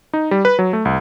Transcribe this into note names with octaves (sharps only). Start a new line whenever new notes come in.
D#4
G3
B4
F#3
A3
C2